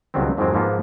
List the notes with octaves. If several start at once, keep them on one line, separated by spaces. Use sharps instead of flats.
C#2 B2 D#3 F#3 G3 C4
F2 G#2 D#3 F#3 G#3 C4
G#2 F3 A#3 B3